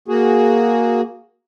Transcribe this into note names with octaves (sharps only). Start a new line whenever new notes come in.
A#3 F#4 G#4